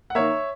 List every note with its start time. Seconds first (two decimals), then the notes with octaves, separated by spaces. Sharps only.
0.10 F#5
0.15 D#3 A#3 C#5 E5